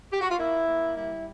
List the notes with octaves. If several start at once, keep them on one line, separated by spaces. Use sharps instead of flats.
G4
F#4
F4
A#3 E4
A#3
G3 E4